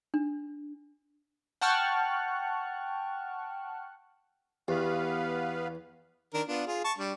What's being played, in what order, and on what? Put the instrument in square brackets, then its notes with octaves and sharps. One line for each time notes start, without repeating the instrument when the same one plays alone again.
[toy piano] D4
[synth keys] F#5 G5 A5 C#6 F6 F#6
[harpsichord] E2 [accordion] B3 B4 F5 [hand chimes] G4
[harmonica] D#3 D4 A#4
B3 D4 F4
F4 G#4
A5 C#6
G3 D4